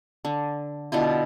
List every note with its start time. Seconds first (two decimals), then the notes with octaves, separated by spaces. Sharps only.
0.25 D3
0.92 B2 D3 E4 F4